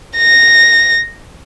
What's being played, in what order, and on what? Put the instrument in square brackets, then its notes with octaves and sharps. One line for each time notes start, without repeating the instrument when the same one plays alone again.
[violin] A#6